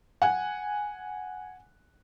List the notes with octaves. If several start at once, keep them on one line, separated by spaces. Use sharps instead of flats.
F#5 G#5